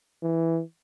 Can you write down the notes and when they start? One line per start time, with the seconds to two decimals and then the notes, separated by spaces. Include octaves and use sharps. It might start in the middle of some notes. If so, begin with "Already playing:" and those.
0.23 E3